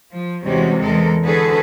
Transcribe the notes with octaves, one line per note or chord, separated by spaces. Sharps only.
F3
E2 C3 G3 G#3 C#4 F#4
E2 G#3 A4 A#4
D3 F#4 G#4 A4 B4